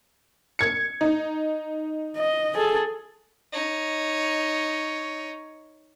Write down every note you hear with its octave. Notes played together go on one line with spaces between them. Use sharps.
G#6 C#7
D#4
D#5
G#4 A4
D#4 C#5